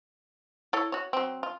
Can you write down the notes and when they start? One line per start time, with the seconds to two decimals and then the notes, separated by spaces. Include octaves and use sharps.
0.73 E4 A4 C#5
0.92 F#4 C#5
1.13 F#3 C4
1.43 F4